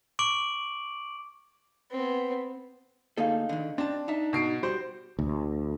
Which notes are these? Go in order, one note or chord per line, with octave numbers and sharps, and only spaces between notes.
C#6 D6 D7 F#7
B3 C4
D2 A#3 D#4 G#4 A4 F5
D3 D#3
C4 D4 A5
D#4 E5 A5
B2 C7 D7
G3 F#4 G4 C5
D2